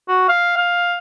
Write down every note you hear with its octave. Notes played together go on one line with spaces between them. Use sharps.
F#4
F5
F5